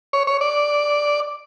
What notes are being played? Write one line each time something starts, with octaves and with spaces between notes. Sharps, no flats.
C#5
C#5
D5